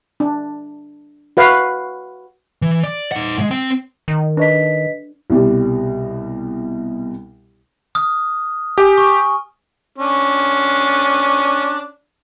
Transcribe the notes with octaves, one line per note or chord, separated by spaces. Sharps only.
D4
F#4 B4 F5
E3
D5
D#4 F#5
A2 G#3
C4 G5
D#3
D4 B4 D#5 B6
C2 B2 G3
D#6 F6
G4 G#5
C#6
C#4 D4